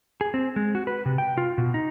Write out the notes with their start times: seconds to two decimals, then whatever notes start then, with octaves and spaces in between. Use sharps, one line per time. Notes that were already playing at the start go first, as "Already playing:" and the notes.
0.21 G#4
0.34 C4
0.56 G#3
0.75 F#4
0.87 B4
1.06 C3
1.18 G5
1.38 F4
1.58 B2
1.74 D#4